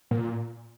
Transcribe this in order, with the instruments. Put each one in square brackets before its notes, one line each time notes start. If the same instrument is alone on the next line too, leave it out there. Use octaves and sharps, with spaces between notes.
[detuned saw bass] A#2